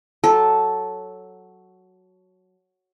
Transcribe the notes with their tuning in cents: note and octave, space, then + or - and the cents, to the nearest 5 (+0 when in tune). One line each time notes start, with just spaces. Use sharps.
F#3 +0 A4 -5